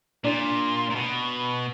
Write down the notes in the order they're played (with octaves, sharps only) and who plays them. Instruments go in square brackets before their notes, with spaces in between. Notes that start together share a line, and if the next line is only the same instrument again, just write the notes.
[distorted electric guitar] A#2 [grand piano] D4
[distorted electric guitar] A#2
B2